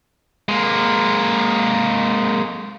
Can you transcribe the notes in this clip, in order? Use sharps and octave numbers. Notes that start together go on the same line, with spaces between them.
G#3 A#3